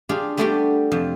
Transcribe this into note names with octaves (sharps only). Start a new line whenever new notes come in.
D4 F4 G4 G#4 F5
G3 A3 B3 D4 F#4 G4
F2 C3 F3